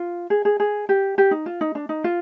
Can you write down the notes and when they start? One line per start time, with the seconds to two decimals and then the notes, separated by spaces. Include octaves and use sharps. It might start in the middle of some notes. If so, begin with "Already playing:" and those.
Already playing: F4
0.30 G#4
0.45 G#4
0.60 G#4
0.89 G4
1.18 G4
1.31 D#4
1.46 F4
1.61 D#4
1.75 D4
1.89 D#4
2.04 F4